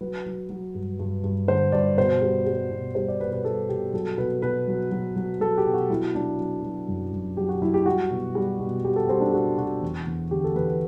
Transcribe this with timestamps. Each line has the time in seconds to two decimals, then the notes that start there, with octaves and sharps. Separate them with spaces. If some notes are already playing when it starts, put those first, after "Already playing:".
0.01 F#3 B4
0.26 F#3
0.50 F#3
0.75 G2
0.99 G2
1.24 G2
1.48 D3 C5
1.72 G2 D5
1.97 B2 C5
2.22 G3
2.46 G3
2.71 B2
2.95 G3 C5
3.08 D5
3.20 B2 B4
3.33 B4
3.45 G3 A4
3.69 B2 G4
3.93 F#3 A4
4.18 B2 B4
4.42 B2 B4
4.68 F#3
4.92 F#3
5.16 F#3
5.40 F#3 A4
5.58 G4
5.66 B2
5.74 F#4
5.90 F#3 E4
6.15 F#3 D4
6.38 F#3
6.63 F#3
6.88 F#2
7.13 F#2
7.37 F#3 G4
7.49 F#4
7.62 F#3 E4
7.74 G4
7.86 G3 F#4
8.10 B2
8.35 G3
8.60 B2
8.85 G3 G4
8.96 A4
9.08 G3 C4
9.21 D4
9.34 G3 F#4
9.57 B2 F#4
9.82 E2
10.06 E2
10.31 D3 G4
10.44 A4
10.56 E2 B4
10.68 B4